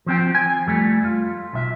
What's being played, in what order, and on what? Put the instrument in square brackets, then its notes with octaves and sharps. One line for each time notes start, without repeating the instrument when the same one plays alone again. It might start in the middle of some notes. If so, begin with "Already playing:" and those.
[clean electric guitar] F3 C4 G5
G#5
F2 G3 A3
F4
B1 E5